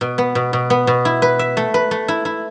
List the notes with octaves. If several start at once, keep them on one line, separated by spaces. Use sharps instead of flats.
B2
B3
B2
B2
B3
B2
E4
B4
E5
A3
B4
A3
E4
E4